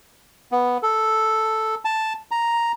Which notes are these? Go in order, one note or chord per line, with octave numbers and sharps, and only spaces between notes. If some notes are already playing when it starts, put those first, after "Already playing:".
B3
A4
A5
A#5